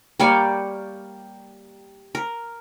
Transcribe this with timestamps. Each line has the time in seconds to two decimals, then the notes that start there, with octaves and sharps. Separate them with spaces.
0.20 G3 A#3 C#5 D5
2.15 A#4